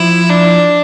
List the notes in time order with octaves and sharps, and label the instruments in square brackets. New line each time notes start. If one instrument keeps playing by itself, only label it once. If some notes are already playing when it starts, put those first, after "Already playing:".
Already playing: [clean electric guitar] F3 [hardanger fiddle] E4
[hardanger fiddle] D4